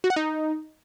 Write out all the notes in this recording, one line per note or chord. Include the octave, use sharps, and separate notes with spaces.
F#4
F#5
D#4